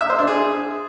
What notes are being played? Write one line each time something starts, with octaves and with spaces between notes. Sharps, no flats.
E5
C5
D4
G#4